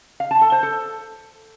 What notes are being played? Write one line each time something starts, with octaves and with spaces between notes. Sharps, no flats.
F5
A5
A4
C5
A4